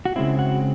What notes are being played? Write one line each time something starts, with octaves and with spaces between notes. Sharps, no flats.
F#4
C#3 G#3 C4 E4
F#4